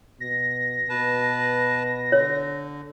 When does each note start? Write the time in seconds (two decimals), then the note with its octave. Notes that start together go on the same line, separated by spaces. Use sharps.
0.20 B2 A#6
0.89 B2 B4 A5
2.12 D3 C#5